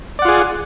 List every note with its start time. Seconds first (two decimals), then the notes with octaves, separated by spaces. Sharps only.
0.19 D5
0.22 F#5
0.25 F4
0.28 G#4